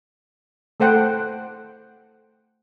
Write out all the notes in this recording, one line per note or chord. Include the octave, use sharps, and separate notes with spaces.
A3 A4 C5 F#5 G5